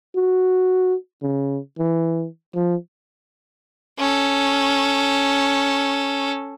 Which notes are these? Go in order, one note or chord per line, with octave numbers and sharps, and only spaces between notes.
F#4
C#3
E3
F3
C#4 A4